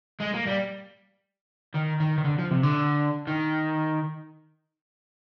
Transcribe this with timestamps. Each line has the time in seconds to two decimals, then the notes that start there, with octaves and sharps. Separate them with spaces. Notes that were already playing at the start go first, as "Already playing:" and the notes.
0.20 G#3
0.34 A#3
0.47 G3
1.74 D#3
2.00 D#3
2.18 D#3
2.25 D3
2.39 F3
2.51 C3
2.63 D3
3.27 D#3